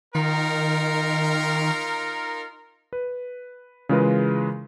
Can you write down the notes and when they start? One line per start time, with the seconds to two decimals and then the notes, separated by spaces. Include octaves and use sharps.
0.15 D#3 D#4 F4 A#4
2.93 B4
3.89 C#3 E3 G#3 F4 A#4 B4